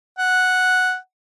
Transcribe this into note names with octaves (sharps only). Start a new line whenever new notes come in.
F#5